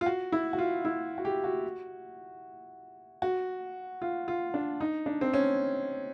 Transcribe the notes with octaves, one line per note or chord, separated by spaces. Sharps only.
F4
F#4
E4
F#4
F4
E4
F#4
G4
F#4
F#4
F4
F4
D4
D#4
D4
C4
C#4